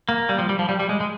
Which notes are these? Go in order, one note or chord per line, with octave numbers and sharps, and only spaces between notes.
A#3
G3
F3
G3
F3
G3
G3
G#3
G#3